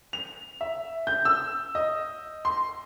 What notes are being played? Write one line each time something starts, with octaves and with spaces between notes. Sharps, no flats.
F7
E5
G6
E6
D#5
C6